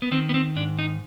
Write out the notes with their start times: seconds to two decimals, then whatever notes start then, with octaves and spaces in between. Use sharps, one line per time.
0.02 B3
0.11 D#3 C4
0.29 B3
0.34 C4
0.56 G#2 D4
0.79 D#4